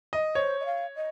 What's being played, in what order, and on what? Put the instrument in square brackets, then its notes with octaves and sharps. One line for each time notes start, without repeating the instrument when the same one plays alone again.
[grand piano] D#5
[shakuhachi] C5 [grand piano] C#5
[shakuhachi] D#5
F5
D#5